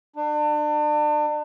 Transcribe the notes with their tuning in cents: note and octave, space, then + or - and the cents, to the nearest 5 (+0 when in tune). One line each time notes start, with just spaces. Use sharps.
D4 +35